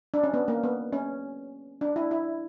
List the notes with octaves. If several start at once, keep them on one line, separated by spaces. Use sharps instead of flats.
D4
C#4
B3
A#3
B3
C#4
D4
E4
E4